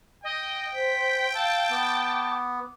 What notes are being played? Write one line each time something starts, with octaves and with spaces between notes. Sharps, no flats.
D#5 G5
C5 B6
F5 A5 E6
B3 D6